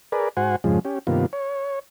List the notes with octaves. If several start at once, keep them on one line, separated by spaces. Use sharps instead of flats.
G#4 A#4 B4 D5
G#2 F#4 C5 F#5 G#5
F2 G#2 C#3 F3 G#3
C#4 G4
G2 C3 D#3 A#3 B3 F4
C#5